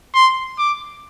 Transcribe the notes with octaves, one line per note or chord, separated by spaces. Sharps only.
C6
D6